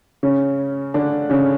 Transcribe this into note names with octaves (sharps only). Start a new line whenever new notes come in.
C#3 C#4
D3 D4
C#3 C#4